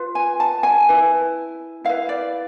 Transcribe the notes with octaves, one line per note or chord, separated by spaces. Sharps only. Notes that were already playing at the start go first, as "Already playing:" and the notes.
Already playing: F4 B4
G#5
A5
G#5
E4 B4
E4 B4 F5
D5